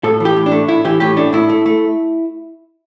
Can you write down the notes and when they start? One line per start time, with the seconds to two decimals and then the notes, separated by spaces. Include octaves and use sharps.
0.04 A2 A4
0.20 E3 G4
0.36 A2
0.46 D4
0.52 A3
0.68 A2 E4
0.85 E3 G4
1.00 A2 G4
1.16 A3 D4
1.33 A2 E4
1.50 A3
1.66 A3